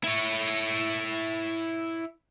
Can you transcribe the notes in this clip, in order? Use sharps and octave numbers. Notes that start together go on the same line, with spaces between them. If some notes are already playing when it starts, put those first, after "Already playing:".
E4 C#5